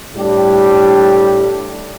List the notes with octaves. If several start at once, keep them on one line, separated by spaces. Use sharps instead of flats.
A2 G3 D4 G4